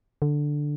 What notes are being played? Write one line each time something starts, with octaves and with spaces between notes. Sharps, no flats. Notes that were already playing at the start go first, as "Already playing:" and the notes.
D3